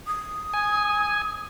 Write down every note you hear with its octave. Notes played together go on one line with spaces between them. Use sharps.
D#6
G#5